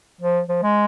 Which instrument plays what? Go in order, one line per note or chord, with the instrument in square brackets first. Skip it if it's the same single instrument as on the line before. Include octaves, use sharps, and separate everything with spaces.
[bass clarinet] F3
F3
G#3